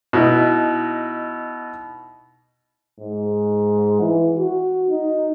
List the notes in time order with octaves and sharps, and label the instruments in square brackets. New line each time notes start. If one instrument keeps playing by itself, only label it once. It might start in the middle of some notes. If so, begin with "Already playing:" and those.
[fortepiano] B2 D#4 E4
[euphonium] G#2
E3
F#4
D#4